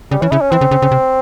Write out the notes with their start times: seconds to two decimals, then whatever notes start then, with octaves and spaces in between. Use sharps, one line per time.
0.11 C#3 G3
0.22 E3 C#4
0.31 C#3 E4
0.41 C#4
0.51 E3 C4
0.61 C#3
0.71 C#3
0.82 C#3
0.92 C3